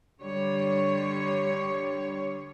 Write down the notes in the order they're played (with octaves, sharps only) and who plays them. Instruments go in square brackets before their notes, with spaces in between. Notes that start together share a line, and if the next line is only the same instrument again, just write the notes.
[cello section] D3 G3 C#5